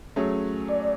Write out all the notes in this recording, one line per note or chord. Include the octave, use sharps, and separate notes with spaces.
F#3 A3 C#4 G#4
D5